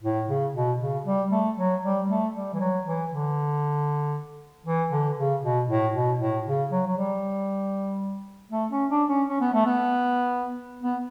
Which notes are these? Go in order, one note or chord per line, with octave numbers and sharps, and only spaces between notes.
A2
C#3
B2
C#3
G3
A3
F#3
G3
A3
G3
E3
F#3
E3
D3
E3
D3
C#3
B2
A2
B2
A2
C#3
F#3
F#3
G3
A3
C#4
D4
C#4
C#4
B3
A3
B3
B3